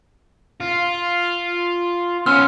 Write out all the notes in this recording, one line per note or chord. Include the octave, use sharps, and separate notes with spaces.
F4
B3 C#4 C6 E6 F6